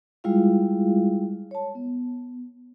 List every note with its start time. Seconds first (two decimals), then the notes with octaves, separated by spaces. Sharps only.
0.24 G3 G#3 E4 F4 G#4 F5
1.51 C#5 A5
1.75 B3